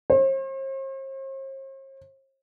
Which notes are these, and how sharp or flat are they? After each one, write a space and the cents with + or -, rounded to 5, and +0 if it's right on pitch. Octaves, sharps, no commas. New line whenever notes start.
C5 +45